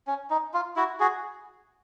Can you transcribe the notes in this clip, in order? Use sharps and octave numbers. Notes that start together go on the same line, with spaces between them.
C#4
D#4
F4
E4 F#4
F#4 G#4